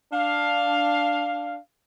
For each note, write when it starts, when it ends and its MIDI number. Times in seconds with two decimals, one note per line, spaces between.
0.12 1.57 62
0.12 1.57 77